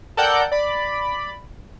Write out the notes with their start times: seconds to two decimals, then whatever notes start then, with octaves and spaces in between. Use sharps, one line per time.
0.17 A4 A#4 D5 F#5 G5 G6
0.52 D5 B5